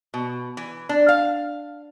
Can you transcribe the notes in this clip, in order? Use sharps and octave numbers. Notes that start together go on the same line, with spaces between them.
B2
E3
D4
F5